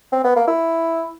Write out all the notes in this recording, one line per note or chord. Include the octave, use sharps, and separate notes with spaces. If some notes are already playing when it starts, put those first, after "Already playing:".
C4
B3
A#3
E4